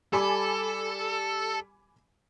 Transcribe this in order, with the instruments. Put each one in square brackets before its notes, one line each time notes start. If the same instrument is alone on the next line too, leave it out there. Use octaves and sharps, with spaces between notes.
[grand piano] G3 [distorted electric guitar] A4 [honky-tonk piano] G#5 B5 D6